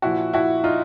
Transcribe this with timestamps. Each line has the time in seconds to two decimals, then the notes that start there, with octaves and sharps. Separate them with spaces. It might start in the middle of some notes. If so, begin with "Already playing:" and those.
0.02 A#2 F3 E4 F#4
0.33 E4 F#4
0.64 D#4 F4